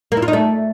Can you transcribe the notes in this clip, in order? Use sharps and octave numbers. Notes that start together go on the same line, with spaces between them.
A#3
E4
F4
D#4
A3